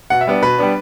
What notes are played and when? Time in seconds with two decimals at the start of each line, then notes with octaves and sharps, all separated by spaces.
0.10 B2 F#5
0.21 E5
0.27 G3 B3 D4
0.42 B2 B4
0.58 G3 B3 D4